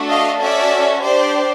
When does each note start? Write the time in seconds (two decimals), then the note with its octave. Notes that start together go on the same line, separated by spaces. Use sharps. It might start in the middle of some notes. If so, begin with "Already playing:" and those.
Already playing: A3 D4 F#4 A4
0.10 D#5 F5
0.41 C#4 F#4 A4 D5 E5
1.04 D4 G4 C5 D5